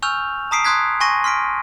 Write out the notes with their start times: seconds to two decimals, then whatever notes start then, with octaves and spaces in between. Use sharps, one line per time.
0.02 G#5 C#6 E6 F6 G6 F7
0.51 A5 A#5 D#6 B6 C7 D7
0.64 C6 D#6 F#6 G#6 B6
1.00 G#5 C6 C#6 A#6 D#7
1.24 C6 F6 B6 D7